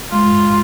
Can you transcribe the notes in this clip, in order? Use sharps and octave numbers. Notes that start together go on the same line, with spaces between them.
G#3 F4